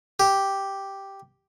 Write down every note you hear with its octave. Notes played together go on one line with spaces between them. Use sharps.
G4